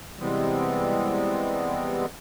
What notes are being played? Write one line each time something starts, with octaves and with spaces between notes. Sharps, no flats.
C3 E3 G3 G#3 B3 C4